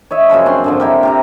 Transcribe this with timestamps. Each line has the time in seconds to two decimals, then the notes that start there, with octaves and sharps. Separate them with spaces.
0.11 C#5 D#5 E5
0.29 F#2 C#3 F3 B5
0.46 C4 D4 C6
0.64 G#2 D3 F3
0.80 E4 G4 A#4
1.03 C3 G4 A#5